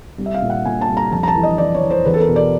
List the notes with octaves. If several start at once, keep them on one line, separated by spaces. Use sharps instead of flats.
C2
E5
F5
A#2
F#5
A#2 G#5
A5
C2
A#5
F2 A5
A#5
A5
E3
D#5
E3 D5
C#5
E3
C5
E2 B4
A4
A#4
B2
D5